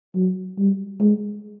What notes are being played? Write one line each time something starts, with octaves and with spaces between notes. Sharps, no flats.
F#3
G3
G#3